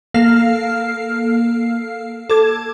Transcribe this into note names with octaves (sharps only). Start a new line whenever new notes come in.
A#3 A4 F5 F6 C7
A4 D6 G#6